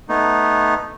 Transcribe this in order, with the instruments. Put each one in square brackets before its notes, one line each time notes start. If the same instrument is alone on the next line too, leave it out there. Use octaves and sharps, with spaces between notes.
[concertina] A3 B3 D#4